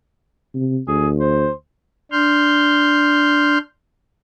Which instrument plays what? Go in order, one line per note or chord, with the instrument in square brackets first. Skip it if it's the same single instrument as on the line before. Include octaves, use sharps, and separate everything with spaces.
[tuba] C3
[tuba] D2 [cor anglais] G#4
[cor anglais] C5
[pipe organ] D4 C6 F6 G6